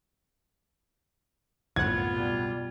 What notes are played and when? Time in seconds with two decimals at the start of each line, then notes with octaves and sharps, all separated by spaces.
1.76 G1 C2 F#2 A2 B3 F4 F#5 G#6
2.13 B2 G3